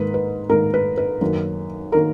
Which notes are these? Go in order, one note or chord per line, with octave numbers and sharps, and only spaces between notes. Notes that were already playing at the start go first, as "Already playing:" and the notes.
Already playing: G#2 D#3 A#3 B4
B4
G#2 D#3 A#3 A#4
B4
B4
F#2 D#3 A#3
D#3 A#3 A#4